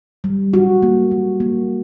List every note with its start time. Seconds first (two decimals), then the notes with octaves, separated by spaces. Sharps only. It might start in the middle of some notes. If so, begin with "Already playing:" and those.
0.24 G3
0.54 F#4
0.83 A#3
1.11 A#3
1.40 A#3